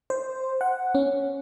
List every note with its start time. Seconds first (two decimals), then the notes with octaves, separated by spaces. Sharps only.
0.10 C5
0.61 F#5
0.95 C#4